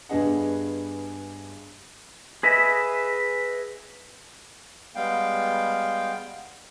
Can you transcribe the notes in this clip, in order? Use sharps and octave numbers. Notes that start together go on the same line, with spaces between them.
G2 B3 D4 G#4 D#5 F#5
G#4 B4 D#5 E5
G3 G#3 B3 F5 G5